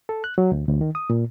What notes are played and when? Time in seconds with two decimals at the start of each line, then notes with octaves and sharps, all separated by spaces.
0.09 A4
0.24 F#6
0.38 F#3
0.52 D2
0.68 D2
0.81 D#3
0.95 D#6
1.10 A#2